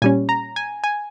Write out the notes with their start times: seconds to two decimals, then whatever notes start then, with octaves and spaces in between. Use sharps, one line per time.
0.02 A#2 G3 C#4 G#5
0.29 A#5
0.56 G#5
0.84 G#5